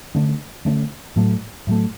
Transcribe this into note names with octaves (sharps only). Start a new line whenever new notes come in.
D3 A3 C#4
D3 A3 C#4
A2 F#3 A3
A2 F#3 A3